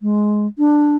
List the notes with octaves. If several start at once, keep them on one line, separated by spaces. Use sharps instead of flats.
G#3
D4